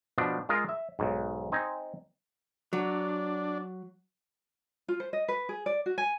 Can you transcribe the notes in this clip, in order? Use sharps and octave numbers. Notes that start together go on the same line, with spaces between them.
B2 F3 D4
G#3 F4 A#4 D#5 F5
E5
B1 G#2
C4 D#4 G#5
F#3 D4
F4
C5
D#5
B4
G#4
D5
F#4
G#5